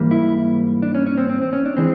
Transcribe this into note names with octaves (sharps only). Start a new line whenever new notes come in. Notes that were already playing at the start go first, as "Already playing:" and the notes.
Already playing: G#2 E3 G3 A#3
E4
D4
C#4
C#4
C4
C4
C4
C#4
D4
E3 G#3 C4